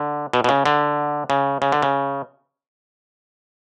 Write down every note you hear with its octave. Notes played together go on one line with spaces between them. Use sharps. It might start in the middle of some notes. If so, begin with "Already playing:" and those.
Already playing: D3
B2
B2
C#3
D3
C#3
C#3
D3
C#3